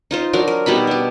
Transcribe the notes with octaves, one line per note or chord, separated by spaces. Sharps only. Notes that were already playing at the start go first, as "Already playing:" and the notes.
D#4 F4 C5
F#3 D4 A#4
A#4
B2 G3 D#4 B5
D4 G4